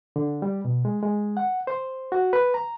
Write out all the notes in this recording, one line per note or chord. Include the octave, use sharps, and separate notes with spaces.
D3
G3
B2
G#3
G#3
F#5
C5
F#4
B4
A#5